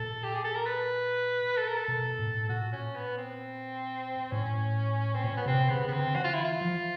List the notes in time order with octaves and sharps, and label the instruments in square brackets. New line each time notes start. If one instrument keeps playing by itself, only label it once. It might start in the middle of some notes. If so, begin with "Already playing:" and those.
Already playing: [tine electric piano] A#2 [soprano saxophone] A4
[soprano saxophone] G4
G#4
A4
A#4
B4
A4
A#4
A4
[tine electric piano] B2
A2
[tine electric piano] A#2 [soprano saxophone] F#4
[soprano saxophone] C#4
B3
C4
[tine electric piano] A2 [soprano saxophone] C#4
[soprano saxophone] C4
[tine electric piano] A#2 [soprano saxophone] C#4
[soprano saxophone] B3
[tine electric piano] C3 [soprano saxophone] C4
[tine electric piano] C#3 [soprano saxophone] B3
[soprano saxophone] B3
[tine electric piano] D3 [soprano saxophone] C4
[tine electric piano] E3 [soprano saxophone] F#4
[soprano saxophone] F4
E4
F4
[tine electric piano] F3